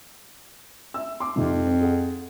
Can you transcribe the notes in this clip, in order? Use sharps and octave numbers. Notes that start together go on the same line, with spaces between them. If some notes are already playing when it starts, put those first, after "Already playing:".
E5 E6
C6 D6
F2 G#2 C3 F3
C4
G#4 F#5